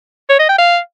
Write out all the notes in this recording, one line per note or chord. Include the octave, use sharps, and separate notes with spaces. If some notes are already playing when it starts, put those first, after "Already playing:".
C#5
D#5
G5
F5